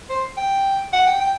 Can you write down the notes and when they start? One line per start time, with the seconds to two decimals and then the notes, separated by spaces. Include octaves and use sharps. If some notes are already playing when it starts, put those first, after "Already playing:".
0.09 C5
0.37 G5
0.93 F#5
1.07 G5
1.21 G5